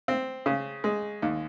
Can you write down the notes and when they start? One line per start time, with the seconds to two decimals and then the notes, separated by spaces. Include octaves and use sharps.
0.08 C4
0.46 C#3
0.84 G#3
1.22 D#2